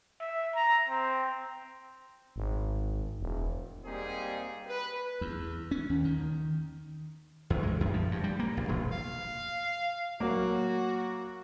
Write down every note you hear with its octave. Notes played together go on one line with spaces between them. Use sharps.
E5
A#5
C4
G#1
E1
G#2 G3 A#3 C4 D#4 G#4
B4
E2
C#4
D#2
D#3
E2
G#3
F#2
F3
G2
G3
A#3
A#1
E1
F5
F#3 A#3 F#4